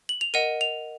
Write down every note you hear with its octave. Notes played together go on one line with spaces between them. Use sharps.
F#7
F7
A#4 D#5 F#5 D#7
F7